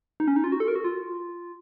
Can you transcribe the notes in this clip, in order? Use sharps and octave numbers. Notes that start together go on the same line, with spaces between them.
D#4
C#4
D#4
F4
F#4
A4
A#4
F#4
F4